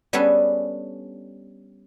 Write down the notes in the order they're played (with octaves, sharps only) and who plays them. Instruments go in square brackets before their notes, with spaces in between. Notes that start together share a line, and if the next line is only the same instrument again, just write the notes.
[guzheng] G3 B3 C#4 D4 G#4 A4